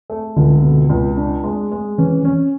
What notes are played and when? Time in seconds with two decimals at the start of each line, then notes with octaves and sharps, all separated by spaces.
0.10 A3
0.36 C#2 D3
0.63 B2
0.89 C#2
1.17 D4
1.44 G#3
1.71 G#3
1.98 E3 C#4
2.25 C#4